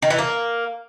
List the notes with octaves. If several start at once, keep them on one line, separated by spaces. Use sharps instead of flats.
D#3
E3
A#3